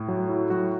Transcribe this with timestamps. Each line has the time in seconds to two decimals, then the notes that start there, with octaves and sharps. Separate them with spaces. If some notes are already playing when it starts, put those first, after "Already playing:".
Already playing: A2
0.08 F#3
0.29 E4
0.50 F#3 F#4